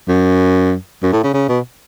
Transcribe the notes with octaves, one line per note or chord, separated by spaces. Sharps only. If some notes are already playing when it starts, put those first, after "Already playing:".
F#2
F#2
A2
C#3
C#3
B2